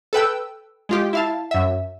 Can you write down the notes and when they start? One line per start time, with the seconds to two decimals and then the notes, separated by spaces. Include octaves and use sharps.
0.13 A4 B4 G5 E6
0.89 G#3 F4 G4
1.13 E4 F5 A5
1.51 F#2 E5